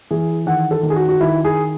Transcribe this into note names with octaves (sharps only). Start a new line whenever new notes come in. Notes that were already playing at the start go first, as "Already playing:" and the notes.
E3 G#4
D#3 F#5
A4
D#3
G#4
F#4
F#4
D#3 E4
G#4